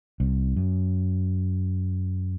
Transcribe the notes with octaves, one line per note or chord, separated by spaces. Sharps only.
C2
F#2